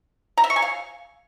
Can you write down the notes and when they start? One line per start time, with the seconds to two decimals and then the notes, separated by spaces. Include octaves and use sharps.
0.37 A#5
0.44 E5
0.50 C#6
0.56 G#5
0.62 F5